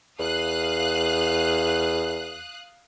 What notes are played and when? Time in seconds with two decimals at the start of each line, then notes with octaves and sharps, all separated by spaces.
0.19 E2 F5 D#6 F#6